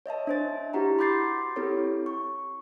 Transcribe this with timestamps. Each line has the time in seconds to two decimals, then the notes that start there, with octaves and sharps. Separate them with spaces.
0.06 C#5 D#5 E5 A5
0.27 D4 C5 A6
0.74 E4 F#4 G4 F#5 A#5
0.99 B5 C6 D6 G6 A6 C7
1.56 C4 E4 G4 A4 C#5
2.06 C#6